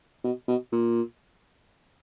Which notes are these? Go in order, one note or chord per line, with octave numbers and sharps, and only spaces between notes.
B2
B2
A#2